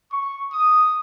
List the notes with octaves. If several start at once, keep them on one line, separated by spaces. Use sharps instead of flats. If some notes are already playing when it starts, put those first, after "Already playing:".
C#6
D#6